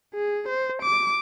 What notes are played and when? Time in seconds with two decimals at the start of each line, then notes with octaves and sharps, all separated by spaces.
0.14 G#4
0.48 C5
0.83 D6